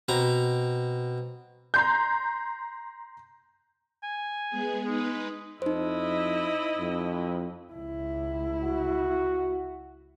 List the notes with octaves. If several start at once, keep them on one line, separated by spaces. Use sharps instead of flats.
B2 C4 A#5
A#5 C6 G6
G#5
G#3 B3 G#4
G#3 D#4 B4
F2 D#4 E4 C5 D#5
F2
C#2 E4
F#4